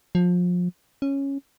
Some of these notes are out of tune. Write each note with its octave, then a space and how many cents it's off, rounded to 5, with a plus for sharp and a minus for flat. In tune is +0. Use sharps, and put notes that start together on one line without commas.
F3 +30
C#4 -5